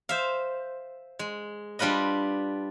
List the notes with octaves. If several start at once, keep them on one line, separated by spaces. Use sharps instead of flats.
C5 E5 F5
G#3
G3 D4 F4 B4 D#5